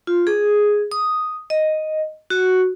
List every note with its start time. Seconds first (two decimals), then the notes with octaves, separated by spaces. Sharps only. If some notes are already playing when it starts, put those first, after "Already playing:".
0.07 F4
0.27 G#4
0.92 D#6
1.50 D#5
2.30 F#4